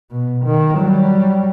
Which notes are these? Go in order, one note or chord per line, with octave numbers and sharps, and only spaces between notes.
B2
D#3
F#3 G3